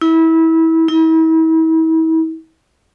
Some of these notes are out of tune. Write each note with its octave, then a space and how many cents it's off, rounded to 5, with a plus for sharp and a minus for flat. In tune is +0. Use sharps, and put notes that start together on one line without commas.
E4 -25
E4 -40